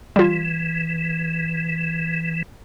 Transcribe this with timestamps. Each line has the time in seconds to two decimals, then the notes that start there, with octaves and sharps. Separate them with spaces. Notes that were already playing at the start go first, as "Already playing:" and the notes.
0.16 E3 G3 F4